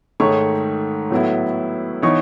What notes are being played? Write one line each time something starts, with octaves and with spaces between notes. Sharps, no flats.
G#2 D#3 A3 C#5 C#6
A2 F#3 B3 E4
E3 B3 D#4 C#5 C#6